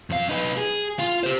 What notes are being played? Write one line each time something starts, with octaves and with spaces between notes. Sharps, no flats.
F2 F5
D#4 B4
G#4
F4 F5
G4 C5